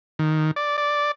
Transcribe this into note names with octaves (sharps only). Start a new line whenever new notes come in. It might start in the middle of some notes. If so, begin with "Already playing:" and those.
D#3
D5
D5